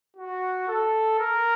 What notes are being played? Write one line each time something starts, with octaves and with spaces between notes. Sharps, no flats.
F#4
A4
A#4